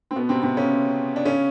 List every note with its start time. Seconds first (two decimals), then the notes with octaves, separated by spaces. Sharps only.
0.11 C4
0.16 B2 B3
0.29 C3 C4
0.43 C3 C4
0.57 C#3 C#4
1.16 D4
1.25 C#3 C#4